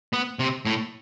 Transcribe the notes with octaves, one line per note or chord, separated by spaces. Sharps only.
B3
C3
A2